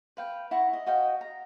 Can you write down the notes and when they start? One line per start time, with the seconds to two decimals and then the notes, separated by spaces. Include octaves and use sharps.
0.17 B4 F5 G5
0.51 E4 F#5 A#5 C#6
0.73 D#5
0.86 F#4 D#5 F5 G5
1.21 A#5